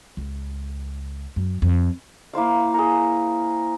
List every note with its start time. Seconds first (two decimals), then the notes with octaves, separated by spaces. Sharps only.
0.17 C#2
1.36 F#2
1.62 F2
2.33 A#3 E4 C5 F5
2.74 G#4 A#4